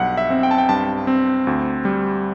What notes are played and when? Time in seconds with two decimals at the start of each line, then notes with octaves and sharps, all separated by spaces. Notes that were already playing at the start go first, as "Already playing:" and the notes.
Already playing: B1 G2 F#5
0.17 E5
0.30 C4
0.43 G5
0.51 A5
0.58 G5
0.69 G2 A5
1.07 C4
1.47 D2
1.85 G3